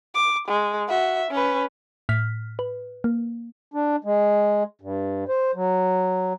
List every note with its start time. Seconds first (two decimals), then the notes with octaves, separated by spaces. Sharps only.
0.15 D6
0.48 G#3
0.89 F#4 E5
1.31 C#4 B4
2.09 A2 F6 B6
2.59 B4
3.04 A#3
3.74 D4
4.04 G#3
4.81 G2
5.29 C5
5.55 F#3